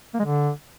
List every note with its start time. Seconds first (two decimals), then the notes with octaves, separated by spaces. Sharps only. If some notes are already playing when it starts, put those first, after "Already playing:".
0.14 A#3
0.19 G#3
0.25 D3